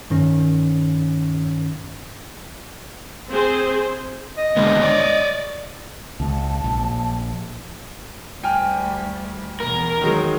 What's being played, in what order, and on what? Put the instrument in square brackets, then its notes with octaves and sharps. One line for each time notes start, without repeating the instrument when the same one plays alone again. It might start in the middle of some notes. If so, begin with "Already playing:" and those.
[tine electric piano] G2 D#3 C#4
[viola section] C4 G#4 C5
[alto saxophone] D#5
[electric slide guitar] D3 G#3 B3
C#5 D5
[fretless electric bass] C#2 [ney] A5
[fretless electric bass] A#1
[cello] D2 G3 [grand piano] G5 G#5 F6
[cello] E2 B2 [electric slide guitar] A#4
[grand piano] D#3 F#3 G#3 [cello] D#4